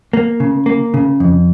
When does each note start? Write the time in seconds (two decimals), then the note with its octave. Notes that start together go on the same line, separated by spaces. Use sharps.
0.13 A#3
0.40 C#3
0.66 A#3
0.94 C#3
1.20 F2